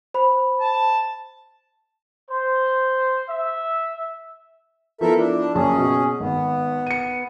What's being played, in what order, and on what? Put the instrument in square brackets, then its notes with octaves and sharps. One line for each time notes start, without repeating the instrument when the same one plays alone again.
[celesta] C5 B5
[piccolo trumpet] A5
[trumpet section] C5
E5
[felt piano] F3 B3 E4 [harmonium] A4 A#4 E5
[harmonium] D4
[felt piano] A#1 F#2 A5 [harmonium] C#4 G#4
[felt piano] B2
[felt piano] G#1 [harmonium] B3
[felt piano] C#7 D#7